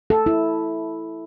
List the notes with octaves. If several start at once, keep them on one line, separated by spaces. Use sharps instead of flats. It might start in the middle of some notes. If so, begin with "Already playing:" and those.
A4
E4